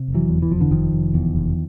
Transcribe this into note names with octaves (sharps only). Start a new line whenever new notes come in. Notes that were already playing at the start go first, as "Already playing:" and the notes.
Already playing: C3
F1
E3 F#3
E2
E3
F1 F3
D3 E3
F1 D#3 F3
F1
E2
F1